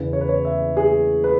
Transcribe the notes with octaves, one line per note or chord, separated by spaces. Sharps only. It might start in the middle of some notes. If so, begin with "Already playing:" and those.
Already playing: E2 C#3 E3 B4
C#5
B4
C#5
E5
G#4
B4